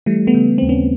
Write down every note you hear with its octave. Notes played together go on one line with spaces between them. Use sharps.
E3 G3 A3
A3 B3
C#3
D#2 C4
B3 C#4